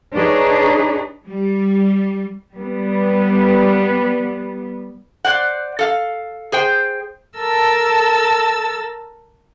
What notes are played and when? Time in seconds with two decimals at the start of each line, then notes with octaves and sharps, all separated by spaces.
0.14 D4 D#4 G#4 B4 C#5
1.26 G3
2.54 G3 B3
5.25 C5 D5 F#5
5.79 A4 F5
6.52 G#4 C5 G5
7.37 A4 A#4 A5 E6 A6